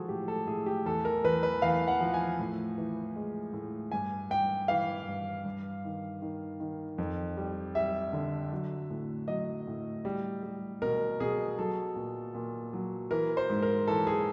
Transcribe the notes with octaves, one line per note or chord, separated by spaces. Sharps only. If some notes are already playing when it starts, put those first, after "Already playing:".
Already playing: F3 G#3 F#4 G#4 A4
A2 G4
A4
A2 G#4
G4
E2 A4
A#4
E2 B4
B4
E2 F5
F#5
F3
G#5
A2
E3
G#3
A2
G2 G#5
G2 G5
E3 F5
G2
G2
D#3
D#3
D#3
F2
G3
G3 E5
D3
F#3
A2
F#3 D#5
A2
G3
G3
B2 A#4
B2 G#4
F#3 A4
A#2
A#2
F#3
E3 A#4
C5
G#2
A#4
E3 A4
G#4